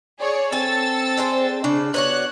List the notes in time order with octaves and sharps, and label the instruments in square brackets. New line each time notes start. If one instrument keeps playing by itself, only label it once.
[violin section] G#4 C#5 D5
[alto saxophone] C4 [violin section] A4 E6 A6 [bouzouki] G#5
[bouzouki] D4 G#4 C5
[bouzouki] C#3 [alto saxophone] D4
[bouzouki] B3 D4 F#4 [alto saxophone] C#5 [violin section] F#6